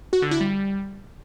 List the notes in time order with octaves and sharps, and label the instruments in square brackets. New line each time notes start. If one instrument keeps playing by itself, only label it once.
[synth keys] F#4
D3
E4
G3